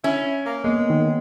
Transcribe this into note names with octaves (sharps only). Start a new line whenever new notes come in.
C#4 E4
A#3
G#3 A#3 B3
D#3